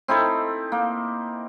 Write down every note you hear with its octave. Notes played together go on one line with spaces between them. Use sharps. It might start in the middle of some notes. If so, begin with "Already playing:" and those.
C4 D#4 E4 A4
A#3